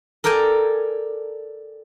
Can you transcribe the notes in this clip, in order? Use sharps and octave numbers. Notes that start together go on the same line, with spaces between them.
A4 A#4 D5 G5 G#5